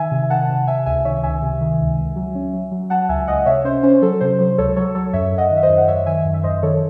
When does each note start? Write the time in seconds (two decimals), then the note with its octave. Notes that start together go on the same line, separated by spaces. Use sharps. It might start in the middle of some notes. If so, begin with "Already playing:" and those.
Already playing: D#3 E5 G#5
0.11 C3
0.30 D#3 F#5 A5
0.49 C3
0.67 C3 E5 G#5
0.86 C#2 E5 G#5
1.05 D#3 C#5 E5
1.23 C#2 E5 G#5
1.42 C3
1.61 D#3
1.80 C#2
1.97 C#2
2.16 F#3
2.35 C#4
2.53 F#3
2.71 F#3
2.90 F#3 F#5 A5
3.09 C#2 E5 G#5
3.27 C#2 D#5 F#5
3.46 C3 C#5 E5
3.64 C#4 C5
3.83 C#4 C5
4.02 F#3 A4
4.21 C3 C5
4.39 F#3 C5
4.58 C#2 A4 C#5
4.76 F#3 A4 C#5
4.95 F#3 A4 C#5
5.13 F#2 C#5 E5
5.32 F#2
5.38 D#5 F#5
5.51 D#3
5.57 E5
5.63 C5 D#5
5.69 F#2
5.78 F#5
5.88 F#2 C#5 E5
6.06 D#3 E5 G#5
6.25 F#2
6.34 E5
6.43 F#2 C5 D#5
6.63 D#3 A4 C#5